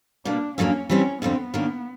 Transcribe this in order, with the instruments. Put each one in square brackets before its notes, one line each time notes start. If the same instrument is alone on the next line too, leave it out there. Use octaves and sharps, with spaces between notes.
[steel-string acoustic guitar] B2 G3 A#3 [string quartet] D4
[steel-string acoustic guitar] F2 C#3 F#3 A#3 D4 [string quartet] C#4
[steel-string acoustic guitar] E3 G3 C4 [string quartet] C#4
[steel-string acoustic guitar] F2 D3 G3 C4 [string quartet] B3
[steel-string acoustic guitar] D#3 F#3 A#3 D4